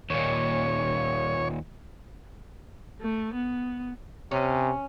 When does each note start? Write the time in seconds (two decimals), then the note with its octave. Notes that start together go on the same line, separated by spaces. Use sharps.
0.10 D#2 A#2 C#5
3.01 A3
3.34 B3
4.31 C3 C#4